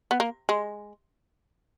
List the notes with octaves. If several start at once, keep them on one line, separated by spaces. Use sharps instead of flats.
B3
A#3
G#3